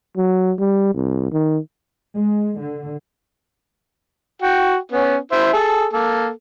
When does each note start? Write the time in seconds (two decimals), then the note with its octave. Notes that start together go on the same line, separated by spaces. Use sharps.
0.17 F#3
0.59 G3
0.94 C2
1.32 D#3
2.15 G#3
2.59 D3
4.42 F#4 G5
4.92 B3 C#4
5.32 E4 C5 E5
5.53 G#4 A4
5.93 A#3 A4